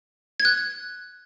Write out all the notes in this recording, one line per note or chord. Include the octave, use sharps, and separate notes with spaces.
G#6
F#6